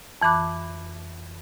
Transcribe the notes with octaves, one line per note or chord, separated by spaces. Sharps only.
F2 E3 B5 D6 F#6